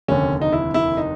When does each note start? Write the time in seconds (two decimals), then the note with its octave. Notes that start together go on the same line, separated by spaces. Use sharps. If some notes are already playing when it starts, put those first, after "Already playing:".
0.08 F1 D#2 D3 C#4
0.41 D#4
0.53 E4
0.74 E4
0.97 D#4